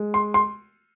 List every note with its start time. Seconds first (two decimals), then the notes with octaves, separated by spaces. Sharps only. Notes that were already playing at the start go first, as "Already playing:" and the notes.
Already playing: G#3
0.14 C6
0.34 C6